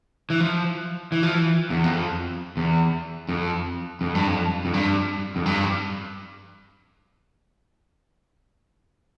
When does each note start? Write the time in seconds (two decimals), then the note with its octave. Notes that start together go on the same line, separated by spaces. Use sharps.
0.30 E3
0.40 F3
1.12 E3
1.23 F3
1.34 E3
1.70 E2
1.84 F2
2.57 E2
3.29 F2
4.01 F2
4.15 G2
4.28 F2
4.65 F2
4.73 G2
5.36 F2
5.46 G2